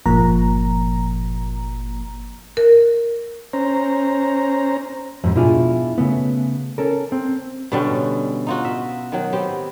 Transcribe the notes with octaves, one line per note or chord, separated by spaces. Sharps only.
G1 A#2 F3 A#3 A#5
A#4
C#4 C5 A#5
F2 G#2
B2 D4 E4 F4 G#4
C#3 A3 B3
C#4 A4 A#4
C4
B2 D3 G3 C#4
D#4 F4 F#4
E5
D#3 F#3
B3 C4 G4